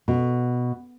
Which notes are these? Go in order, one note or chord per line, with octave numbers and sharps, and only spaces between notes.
B2